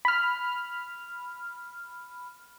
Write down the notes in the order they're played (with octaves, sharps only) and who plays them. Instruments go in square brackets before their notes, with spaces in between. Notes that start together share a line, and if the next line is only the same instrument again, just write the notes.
[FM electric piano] B5 F6